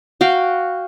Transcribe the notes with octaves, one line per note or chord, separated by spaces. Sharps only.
F#4 F5 G5